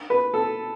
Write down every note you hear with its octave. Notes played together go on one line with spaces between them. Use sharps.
B4
A4